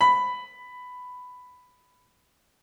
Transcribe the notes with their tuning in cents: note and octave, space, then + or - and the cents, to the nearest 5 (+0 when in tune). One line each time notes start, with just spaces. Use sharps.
B5 +10